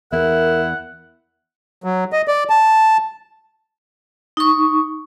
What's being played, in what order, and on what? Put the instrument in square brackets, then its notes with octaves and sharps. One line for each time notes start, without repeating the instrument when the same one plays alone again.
[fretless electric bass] E2 [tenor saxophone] E4 [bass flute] A#4 [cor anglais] F#5
[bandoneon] F#3
D#5
D5
A5
[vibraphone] D#4 C#6